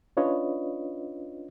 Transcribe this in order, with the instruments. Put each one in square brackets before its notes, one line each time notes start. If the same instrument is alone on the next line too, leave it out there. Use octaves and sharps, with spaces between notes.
[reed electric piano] C#4 D4 F4 B4 C#5 D#5